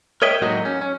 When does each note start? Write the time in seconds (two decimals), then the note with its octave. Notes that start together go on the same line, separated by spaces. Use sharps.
0.22 A#4 C#5 D#5 E5 G5
0.42 A2 F#3 G#3 A#3 D#4 F#4
0.65 C#4
0.81 C#4